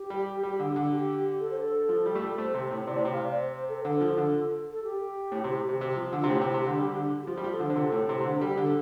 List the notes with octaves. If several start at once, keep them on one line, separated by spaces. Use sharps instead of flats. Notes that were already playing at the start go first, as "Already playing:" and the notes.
Already playing: G4
G3
G3
D3
D3
G4
A4
C5
A4
F3
G3
A3
G3
A4
A3 C5
C3
A2
C3 D5
A2 C5
C3
F5
D5
C5
C5
A4
C5
D3 A4
F3
D3
A4
G4
A2
C3
C3
C3
F3
D3
C3 F4
A2 G4
C3
C3
D3
G3
D3
G4
F3 F4
G3 G4
F3
A4
D3
C5
D3
C3 A4
A2
C3
C3
D3 C5
A4
G3
G4
D3
A4